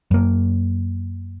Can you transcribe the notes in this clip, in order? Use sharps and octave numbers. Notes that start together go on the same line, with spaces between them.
F#2 A#3